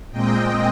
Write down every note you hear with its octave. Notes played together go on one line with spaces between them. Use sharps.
A#2 G#3 C4 D#5 G5